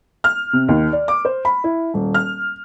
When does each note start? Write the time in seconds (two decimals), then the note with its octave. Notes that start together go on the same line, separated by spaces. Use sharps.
0.24 F6
0.53 C3
0.69 D#2
0.93 D5
1.08 D6
1.25 C5
1.45 B5
1.64 E4
1.94 D#1
2.14 F6